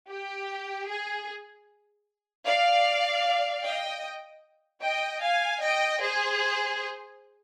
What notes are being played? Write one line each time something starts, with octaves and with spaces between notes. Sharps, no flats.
G4
G#4
D5 F5
D#5 G5
D#5 G5
F5 G#5
D#5 G5
G#4 C5